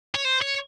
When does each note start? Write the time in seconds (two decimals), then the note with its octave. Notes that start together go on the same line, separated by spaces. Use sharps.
0.15 C#5
0.25 C5
0.42 C#5